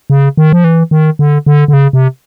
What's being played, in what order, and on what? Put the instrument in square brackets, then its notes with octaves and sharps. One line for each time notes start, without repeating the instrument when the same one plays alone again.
[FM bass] C#3
D#3
F3
E3
D#3
D3
D3
D3
C#3
C3